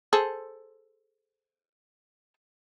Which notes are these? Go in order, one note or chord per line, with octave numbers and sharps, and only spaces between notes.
G#4 A4 C5